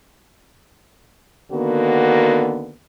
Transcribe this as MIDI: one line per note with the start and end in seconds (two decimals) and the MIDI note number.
1.52 2.73 50
1.52 2.73 51
1.52 2.73 58
1.52 2.73 59
1.52 2.73 66